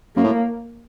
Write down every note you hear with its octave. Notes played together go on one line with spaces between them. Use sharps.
F#2 A#3
A2